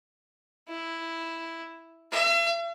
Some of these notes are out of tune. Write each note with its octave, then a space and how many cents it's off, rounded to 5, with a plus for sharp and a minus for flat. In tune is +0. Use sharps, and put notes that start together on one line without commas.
E4 +0
E5 +45